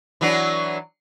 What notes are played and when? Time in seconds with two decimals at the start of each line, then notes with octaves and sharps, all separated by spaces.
0.21 E3 F#3 D4